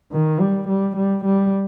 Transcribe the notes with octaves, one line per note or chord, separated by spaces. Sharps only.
D#3
G3
G3
G3
G3